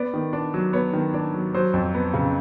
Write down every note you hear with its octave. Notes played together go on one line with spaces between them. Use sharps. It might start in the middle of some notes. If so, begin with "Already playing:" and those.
Already playing: B3 D5
D#3
D4
F#3
B3 C#5
D#3
D4
F#3
F#3 C5
F2
B3
C#3